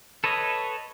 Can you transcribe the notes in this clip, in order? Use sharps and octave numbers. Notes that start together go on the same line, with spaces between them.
A4 B4 C#5 D#5